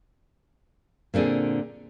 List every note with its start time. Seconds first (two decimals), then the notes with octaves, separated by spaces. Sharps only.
1.14 A#2 D3 C4 D4 G#4